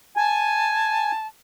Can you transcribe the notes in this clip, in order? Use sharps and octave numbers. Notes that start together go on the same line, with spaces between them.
G#5 A5